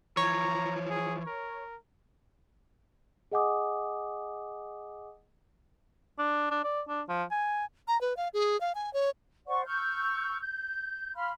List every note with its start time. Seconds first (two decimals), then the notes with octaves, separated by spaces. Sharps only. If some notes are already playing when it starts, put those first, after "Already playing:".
0.17 E3 F3 C#5 A#5
0.89 G#4
1.27 A#4
3.32 G#4 D#5 F#5 G#5 D6 D#6
6.18 D4
6.50 D4
6.64 D5
6.88 D4
7.08 F3
7.31 G#5
7.88 A#5
8.01 B4
8.17 F5
8.34 G#4
8.61 F5
8.75 G#5
8.94 C#5
9.47 C5 D5 F#5 C#6
9.66 C#6 E6 F6 G6
10.40 G6
11.15 F5 B5 C6 F6